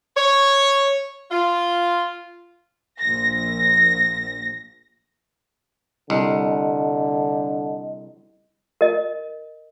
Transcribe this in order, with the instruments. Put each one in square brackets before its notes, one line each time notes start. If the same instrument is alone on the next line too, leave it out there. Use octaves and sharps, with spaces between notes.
[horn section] C#5
F4
[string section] A#1 A#6
[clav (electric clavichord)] C2 [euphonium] D3 [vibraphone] D#5
[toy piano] A#4 D#5